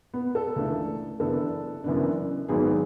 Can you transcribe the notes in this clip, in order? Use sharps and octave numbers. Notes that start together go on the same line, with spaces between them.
B3 B4
A4
C#2 C#3 E3 A3 D4
F#1 F#2 E3 B3 D4 A4
F#1 F#2 E3 B3 D4
G#1 G#2 F#3 B3 G#4